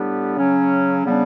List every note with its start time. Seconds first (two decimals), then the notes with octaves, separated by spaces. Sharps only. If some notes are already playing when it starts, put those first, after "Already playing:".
Already playing: A2 G3 B3 D4 G4
0.36 C#3 F#3 C#4
1.05 C#3 G3 B3 D4